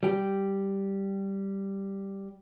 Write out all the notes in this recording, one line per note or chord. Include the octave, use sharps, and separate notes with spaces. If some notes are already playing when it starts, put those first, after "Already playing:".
G3 G4